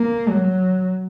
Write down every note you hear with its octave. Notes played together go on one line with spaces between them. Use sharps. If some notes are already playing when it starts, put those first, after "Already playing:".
Already playing: A#3
F#3